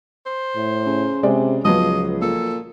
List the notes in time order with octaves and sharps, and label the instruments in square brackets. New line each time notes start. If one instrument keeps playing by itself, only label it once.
[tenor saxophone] C5
[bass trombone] A2
[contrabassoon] C#3
[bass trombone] C3 [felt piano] G#3 D5
[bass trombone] C#2 [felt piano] F3 F#3 B3 [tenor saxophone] D#5
[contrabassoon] A#2 [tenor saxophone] A4